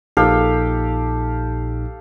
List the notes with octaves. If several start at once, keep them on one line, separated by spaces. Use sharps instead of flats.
A#1 A#2 D#4 G4 A4 F5